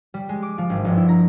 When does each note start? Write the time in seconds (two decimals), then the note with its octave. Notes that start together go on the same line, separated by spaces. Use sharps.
0.14 G3
0.29 G#3
0.43 D6
0.58 F3
0.70 G#1
0.85 G1
0.97 E4
1.09 A#5